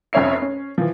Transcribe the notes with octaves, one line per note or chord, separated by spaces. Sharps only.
F1 F2 C#4 C#5 E5 C7
C#4
E3 F3